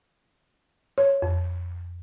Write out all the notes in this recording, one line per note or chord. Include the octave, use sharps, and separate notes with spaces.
C#5
F2